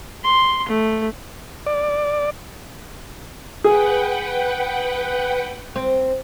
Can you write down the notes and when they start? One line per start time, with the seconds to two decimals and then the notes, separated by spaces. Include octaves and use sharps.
0.24 C6
0.68 A3
1.67 D5
3.64 G#4 B4 F#5 G5
5.76 C4